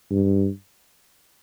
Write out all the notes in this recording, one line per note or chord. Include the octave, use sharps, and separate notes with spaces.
G2